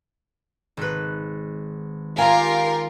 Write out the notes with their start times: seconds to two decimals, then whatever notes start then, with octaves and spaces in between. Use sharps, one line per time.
0.77 G#1 B4
2.18 F4 G4 A#4 F5 G#5